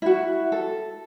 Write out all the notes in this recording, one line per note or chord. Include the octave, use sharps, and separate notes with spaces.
E4 F#4
A4